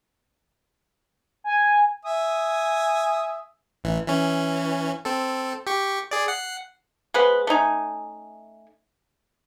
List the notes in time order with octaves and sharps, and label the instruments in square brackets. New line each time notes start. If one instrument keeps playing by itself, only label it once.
[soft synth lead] G#5
[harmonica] E5 G#5 D#6
[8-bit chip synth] A1 E3
E3 C#4
C4 A4
G4 C#6
G#4 D5
F#5 C7
[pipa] G#3 B3 B4 C5
A3 C#4 D#4 G#5